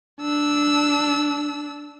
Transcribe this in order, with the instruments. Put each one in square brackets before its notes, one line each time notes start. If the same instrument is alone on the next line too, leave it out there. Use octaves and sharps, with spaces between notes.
[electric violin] D4 E6